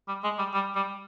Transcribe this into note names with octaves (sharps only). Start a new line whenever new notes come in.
G3
G#3
G3
G3
G3